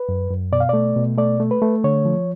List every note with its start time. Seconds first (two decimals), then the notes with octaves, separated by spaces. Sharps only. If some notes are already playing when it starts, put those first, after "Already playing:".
Already playing: B4
0.09 F#2
0.31 F#2
0.52 B2 D5
0.60 F5
0.69 A3 D5
0.96 B2
1.18 A3 D5
1.40 A3
1.51 B4
1.62 A3
1.84 D3 C#5
2.05 F3